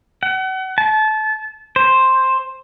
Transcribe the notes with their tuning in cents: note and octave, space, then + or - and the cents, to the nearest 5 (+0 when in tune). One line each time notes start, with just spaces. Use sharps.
F#5 +35
A5 -25
C5 +5